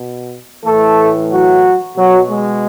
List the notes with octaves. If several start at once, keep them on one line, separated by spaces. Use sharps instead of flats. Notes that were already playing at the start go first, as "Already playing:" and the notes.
Already playing: B2
A2 E3 A3 A4
F#3 F#4
B2 F#3 F#4
G#3